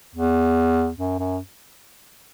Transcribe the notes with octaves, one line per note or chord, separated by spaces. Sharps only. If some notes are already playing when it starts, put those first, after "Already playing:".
E2
F#2
F#2